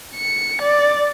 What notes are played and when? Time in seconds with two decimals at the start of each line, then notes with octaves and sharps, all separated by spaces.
0.15 C#7
0.62 D5